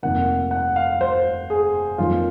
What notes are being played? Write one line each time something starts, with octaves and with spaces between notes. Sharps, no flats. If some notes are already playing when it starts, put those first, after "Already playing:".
F1 F2 C3 D#3 A#3 F#5
F#5
F5
C5
G#4
F2 D#3 F#3 A#3 F4